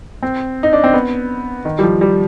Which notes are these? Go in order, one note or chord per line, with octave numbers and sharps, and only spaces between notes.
C4
D#4
D4
C4
B3
D#3
G3
F3
G3